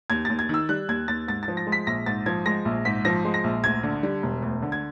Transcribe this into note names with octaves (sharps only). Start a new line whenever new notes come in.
D#2 G#6
D#2 A6
G#6
D#3 E6
G3 F#6
D#2 G#6
D#2 A6
G#2 A6
A6
F3
A#6
G#3
B6
A#1 A#6
G#2 A6
F3 G#6
G#3 A#6
A#1
G#2 B6
F3 A#6
G#3
A#6
A#1
D2 G#6
D3
G3
E1
D2
D3
G#6